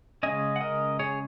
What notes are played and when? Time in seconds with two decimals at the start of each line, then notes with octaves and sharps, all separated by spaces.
0.23 C#3 G#3 C#4 D#5 G#5
0.56 F#5
0.61 A#4 D#5
0.99 G#4 C#5